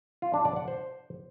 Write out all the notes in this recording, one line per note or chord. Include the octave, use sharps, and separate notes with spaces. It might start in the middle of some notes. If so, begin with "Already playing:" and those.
F4
D4
D5
F#5
C5